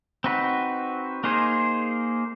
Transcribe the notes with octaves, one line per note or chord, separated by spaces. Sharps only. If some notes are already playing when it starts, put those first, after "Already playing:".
C4 D#4 F#4 B4
A#3 D#4 G#4 C5